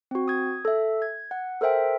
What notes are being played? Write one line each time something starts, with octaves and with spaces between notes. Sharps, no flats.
C4 F#4
D#6 G#6
A4 E5
G#6
F#5
A4 A#4 C5 E5 G5